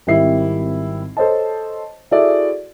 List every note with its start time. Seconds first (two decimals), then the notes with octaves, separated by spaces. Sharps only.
0.07 G#1 G3 C4 E4 C7
1.17 A4 C5 C#5 D#5 A5
2.11 E4 F#4 G#4 A4 D5 E5